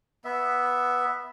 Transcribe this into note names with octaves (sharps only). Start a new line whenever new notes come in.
B3 E5